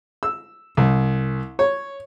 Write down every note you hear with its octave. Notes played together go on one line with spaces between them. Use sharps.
E6
C2
C#5